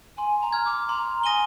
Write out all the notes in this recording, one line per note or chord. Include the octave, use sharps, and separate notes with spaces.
G#5 C6
A#5
F6 G#6
D6
A#5 C6
G#5 D#6 A#6 D#7 G7